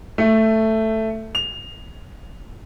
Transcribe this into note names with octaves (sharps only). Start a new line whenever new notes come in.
A3
F7